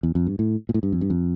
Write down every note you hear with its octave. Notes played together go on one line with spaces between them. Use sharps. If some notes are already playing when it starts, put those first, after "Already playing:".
E2
F2
G2
A2
A#2
A2
G2
F2
G2
F2